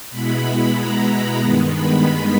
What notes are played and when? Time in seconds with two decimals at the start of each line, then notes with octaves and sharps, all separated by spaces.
0.10 B2 G#3 B3 E4 B5
0.75 A#5
1.39 G2 D#3 G#3 B3
1.71 B5